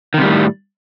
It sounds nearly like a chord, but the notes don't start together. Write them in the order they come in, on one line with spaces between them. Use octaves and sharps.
D#3 C3 G3 A2